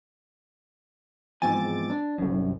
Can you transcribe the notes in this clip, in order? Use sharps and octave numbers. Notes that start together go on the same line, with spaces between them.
E2 G#2 F3 C4 G#5 D6 A6
D4
G1 C2 F#2